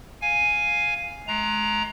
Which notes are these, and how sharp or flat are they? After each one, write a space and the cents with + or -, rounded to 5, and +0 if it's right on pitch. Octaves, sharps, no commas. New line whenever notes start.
F5 +0 G#5 +0
G#3 +35 A#5 +0